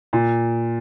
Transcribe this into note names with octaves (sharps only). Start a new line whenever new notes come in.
A#2